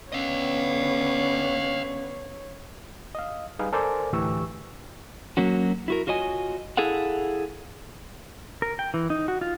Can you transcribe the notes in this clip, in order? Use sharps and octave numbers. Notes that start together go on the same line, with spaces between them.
D3 B3 C#4 C#5 D#5 F5
D#5 F5
G3 D#4 G#4 B4 F5
A4 A#4 C5 D5 G#5 D6
D2 A2 E3 G4 C#6 E6
F#3 A#3 C#4 F#4
E4 F#4 A#4
F4 F#4 C#5 D#5 G#5
E4 G#4 A4 F5 F#5
A#4
G5
E3
D#4
F#4
F4